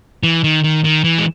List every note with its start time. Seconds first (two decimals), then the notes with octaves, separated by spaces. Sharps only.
0.23 E3
0.44 D#3
0.64 D#3
0.84 D#3
1.04 E3
1.18 G#3